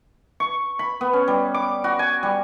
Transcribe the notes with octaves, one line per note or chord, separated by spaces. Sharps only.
C#6
B5
B3
C#4
G3
D6
F#4
G#5
G3